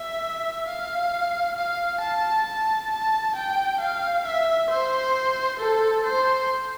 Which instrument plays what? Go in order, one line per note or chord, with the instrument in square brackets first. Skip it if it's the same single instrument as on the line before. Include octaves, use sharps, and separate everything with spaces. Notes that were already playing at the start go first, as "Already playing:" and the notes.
Already playing: [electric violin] E5
F5
F5
A5
A5
A5
G5
F5
E5
C5
A4
C5